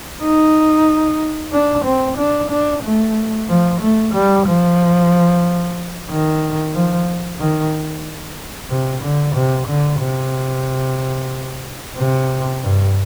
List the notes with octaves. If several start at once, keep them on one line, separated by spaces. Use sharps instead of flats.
D#4
D4
C4
D4
D4
A3
F3
A3
G3
F3
D#3
F3
D#3
C3
D3
C3
D3
C3
C3
G2